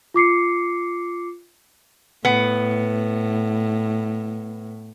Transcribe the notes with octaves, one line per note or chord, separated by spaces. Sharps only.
F4 D6 C7 C#7
A2 B3